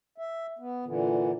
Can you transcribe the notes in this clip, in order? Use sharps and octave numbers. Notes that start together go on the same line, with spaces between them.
E5
B3
A#2 D3 E3